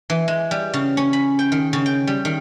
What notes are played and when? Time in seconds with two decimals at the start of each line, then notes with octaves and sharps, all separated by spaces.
0.10 E3
0.28 G#3
0.51 G3
0.73 C#3
0.97 C#4
1.13 B5
1.39 G5
1.52 D#3
1.73 C#3
1.86 G5
2.07 G3
2.25 D#3